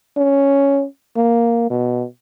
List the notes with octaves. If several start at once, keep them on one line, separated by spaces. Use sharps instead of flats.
C#4
A#3
B2